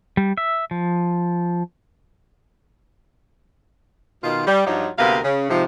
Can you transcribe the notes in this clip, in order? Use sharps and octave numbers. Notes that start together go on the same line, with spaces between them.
G3
E5
F3
B2 D#3 F4
G3
G2 F3 F#3 D#4 F4 G4
D2 C3 A#3 B3 A#4 F5
C#3
G#2 C3 F3